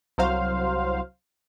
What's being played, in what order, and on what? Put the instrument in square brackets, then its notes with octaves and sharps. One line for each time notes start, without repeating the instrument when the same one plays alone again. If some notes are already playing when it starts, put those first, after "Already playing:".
[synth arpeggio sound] C2 F#3 C5 F5